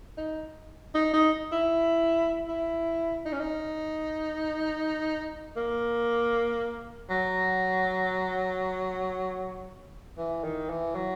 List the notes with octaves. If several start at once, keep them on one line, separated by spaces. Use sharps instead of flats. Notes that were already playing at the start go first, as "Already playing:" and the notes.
D#4
D#4
D#4
E4
E4
D#4
C#4
D#4
A#3
F#3
E3
D#3
E3
F#3